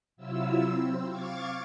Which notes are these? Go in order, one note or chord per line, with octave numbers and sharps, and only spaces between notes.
C3 F#3 E4 F4 E6
C4
F5 C#6 D6 G#6 A6